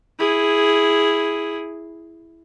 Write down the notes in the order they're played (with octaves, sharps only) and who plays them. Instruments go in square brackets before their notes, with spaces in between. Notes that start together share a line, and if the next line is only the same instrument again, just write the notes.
[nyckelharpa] E4 G#4